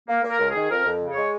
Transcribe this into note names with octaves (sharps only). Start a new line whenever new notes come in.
A#3
A#3
A#4
C#2
G#4
D#3
F2 A#4
F2
C#3
G#3 C#5